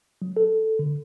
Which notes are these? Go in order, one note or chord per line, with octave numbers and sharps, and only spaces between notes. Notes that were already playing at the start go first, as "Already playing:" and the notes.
F#3
A4
D3